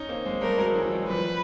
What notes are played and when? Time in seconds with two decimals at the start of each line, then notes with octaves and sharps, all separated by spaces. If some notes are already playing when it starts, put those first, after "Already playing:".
Already playing: C#4 D#4
0.09 A#3 C4
0.26 G#3 A#3
0.42 G3 A3 A#4
0.58 F#3 G#3
0.75 E3 F#3
0.91 F#3 G#3
1.08 F3 G3 B4